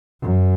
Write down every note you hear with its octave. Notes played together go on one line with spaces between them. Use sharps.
F#2